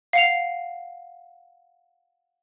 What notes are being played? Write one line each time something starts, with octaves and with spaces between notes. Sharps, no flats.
F5 F#5 F7